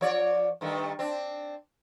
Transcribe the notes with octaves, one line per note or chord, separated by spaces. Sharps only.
F3 C#5 D5
G2 D#3 A3
C4 D4